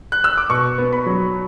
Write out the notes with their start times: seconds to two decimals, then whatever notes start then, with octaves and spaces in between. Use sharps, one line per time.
0.12 F#6
0.24 E6
0.37 D6
0.49 B2 C#6
0.78 B3
0.93 B5
1.06 F#3